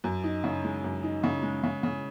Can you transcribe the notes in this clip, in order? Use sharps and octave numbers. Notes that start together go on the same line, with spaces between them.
F#2
D#4
C#3
G#3
F#2
D#4
C#3
G#3
C#3
C#3